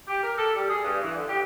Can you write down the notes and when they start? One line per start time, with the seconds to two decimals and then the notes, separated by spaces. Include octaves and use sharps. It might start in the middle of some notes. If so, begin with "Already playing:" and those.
0.08 G4
0.24 A#4
0.38 A4
0.54 G3
0.68 G#4
0.84 G2
1.03 E3
1.16 D3
1.28 G4